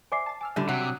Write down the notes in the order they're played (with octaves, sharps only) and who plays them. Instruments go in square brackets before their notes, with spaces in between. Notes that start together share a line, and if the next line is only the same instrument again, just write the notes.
[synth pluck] C5 D5 E5 [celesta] G#5 D6 C7
[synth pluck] A5 A6
[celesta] G#5 [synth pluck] D6 E6 F6
[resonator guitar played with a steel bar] A2 D3 [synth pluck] G3 E5
[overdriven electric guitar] C3 [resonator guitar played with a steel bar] F#3 [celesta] F#5
[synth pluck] D6 D#6